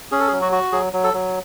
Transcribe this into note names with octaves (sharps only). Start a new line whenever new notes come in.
C#4 G#4
A4
G#4
F#3
F#4
F#4
F#3 G#4
F#3
A4
F#3